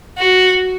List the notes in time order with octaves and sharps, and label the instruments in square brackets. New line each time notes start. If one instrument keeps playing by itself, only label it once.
[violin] F#4